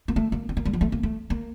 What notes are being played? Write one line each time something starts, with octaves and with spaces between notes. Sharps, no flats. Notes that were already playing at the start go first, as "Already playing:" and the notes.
A#3
A3
A#3
C4
A#3
G3
F3
A3
A#3
A3
A#3